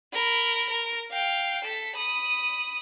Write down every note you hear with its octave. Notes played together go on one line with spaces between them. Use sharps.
A#4 B5
A#4
F5 G5
A4 B6
B5 D#6